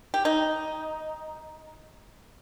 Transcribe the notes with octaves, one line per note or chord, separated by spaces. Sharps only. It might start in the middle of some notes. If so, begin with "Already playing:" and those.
G4
D#4